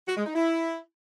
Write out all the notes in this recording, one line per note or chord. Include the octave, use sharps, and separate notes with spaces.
F#4
G#3
D#4
E4